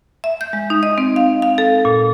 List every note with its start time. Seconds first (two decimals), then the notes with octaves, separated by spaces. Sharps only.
0.24 E5
0.41 G6
0.53 G#3
0.70 D#4
0.83 D#5
0.98 C4
1.16 F5
1.42 F5
1.58 A4
1.85 A#2